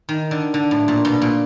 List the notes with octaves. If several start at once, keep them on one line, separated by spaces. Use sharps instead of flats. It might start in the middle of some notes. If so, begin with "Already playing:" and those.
D#3
D3
D3
A2
A#2
B2
A#2